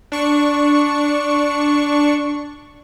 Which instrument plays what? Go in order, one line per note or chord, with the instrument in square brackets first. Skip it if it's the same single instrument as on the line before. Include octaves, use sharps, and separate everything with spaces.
[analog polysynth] D4 C#6